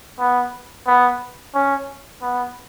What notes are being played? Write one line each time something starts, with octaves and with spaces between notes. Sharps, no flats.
B3
B3
C#4
B3